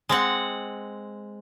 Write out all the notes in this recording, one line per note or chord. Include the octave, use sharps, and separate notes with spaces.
G#3 C4 F#5